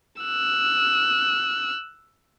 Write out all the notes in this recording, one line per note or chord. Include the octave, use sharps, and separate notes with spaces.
E6 F#6